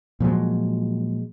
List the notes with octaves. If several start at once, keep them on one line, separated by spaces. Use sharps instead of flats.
A#2 F3 F#3 G#3